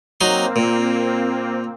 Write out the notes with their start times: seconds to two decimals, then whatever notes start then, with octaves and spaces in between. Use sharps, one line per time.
0.21 F#3 A#3 C4 D#4 C6
0.56 A#2